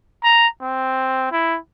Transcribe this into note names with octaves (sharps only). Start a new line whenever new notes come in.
A#5
C4
E4